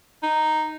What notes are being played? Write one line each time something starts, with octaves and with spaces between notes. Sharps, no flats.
D#4